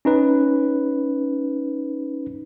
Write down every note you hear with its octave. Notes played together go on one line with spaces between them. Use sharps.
C#4 D#4 B4